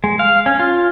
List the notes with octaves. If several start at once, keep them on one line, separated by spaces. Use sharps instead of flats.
G#3
F5
C#4
F4